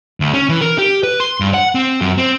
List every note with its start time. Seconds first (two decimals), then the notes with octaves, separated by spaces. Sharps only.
0.20 D2
0.34 C#4
0.49 E3
0.61 A#4
0.78 G4
1.03 B4
1.20 C6
1.40 G2
1.54 F#5
1.75 C4
2.01 F#2
2.18 C4